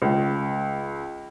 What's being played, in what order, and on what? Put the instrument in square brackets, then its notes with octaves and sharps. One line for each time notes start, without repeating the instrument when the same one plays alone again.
[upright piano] C#2